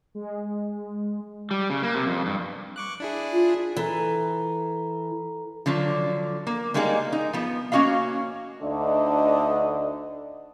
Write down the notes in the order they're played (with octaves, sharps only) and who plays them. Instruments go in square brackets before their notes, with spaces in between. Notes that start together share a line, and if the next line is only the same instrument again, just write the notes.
[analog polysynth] G#3
[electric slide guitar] G3
C#3
A#3
C3
F2
G2
[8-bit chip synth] C#6 D6 F#6
D4 E4 G#4
[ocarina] F4
[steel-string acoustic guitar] E3 [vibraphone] A4 A#5
[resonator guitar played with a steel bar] D3 F3 F#3 D4
A#3
G3 G#3 A#3 D#4 G#4
D#4
F3 B3
A#3 C#4 F#4 D#5 F5
[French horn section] D2 D3 A3 D4 D#4 D#5